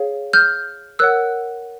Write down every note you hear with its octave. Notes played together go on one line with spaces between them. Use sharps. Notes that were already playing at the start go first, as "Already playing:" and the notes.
Already playing: G#4 C#5 F5
F6 G6
A#4 C#5 F#5 E6 F#6